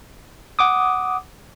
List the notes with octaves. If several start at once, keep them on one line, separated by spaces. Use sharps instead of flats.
F#5 D6 D#6